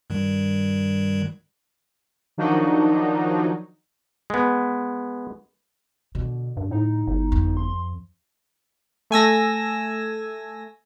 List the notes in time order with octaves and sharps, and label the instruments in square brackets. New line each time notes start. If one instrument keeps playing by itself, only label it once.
[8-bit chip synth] G2 D#3 G3
[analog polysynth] D#3 F3 F#3 D4 D#4 F#4
[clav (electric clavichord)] G#3 B3
[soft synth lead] B2 [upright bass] D3
[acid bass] G2
[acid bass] A2 [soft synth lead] D#4
[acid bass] G1
[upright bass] F2
[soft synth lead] C6
[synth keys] A3 G#5 E6 A#6